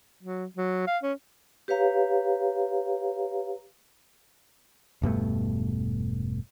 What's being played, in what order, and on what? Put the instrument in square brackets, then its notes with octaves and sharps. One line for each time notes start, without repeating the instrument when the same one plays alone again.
[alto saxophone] F#3
F#3
F5
C#4
[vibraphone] G4 B4 C#5 F5 A#5
[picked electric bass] E1 G2 B2 A3